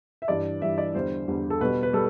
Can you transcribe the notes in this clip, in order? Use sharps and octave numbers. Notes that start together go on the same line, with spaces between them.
E5
G2 E3 G3 D5
G2 E3 G3 E5
D5
E2 D3 G3 C5
E2 D3 G3
A4
B2 G3 B4
B4
G3 A4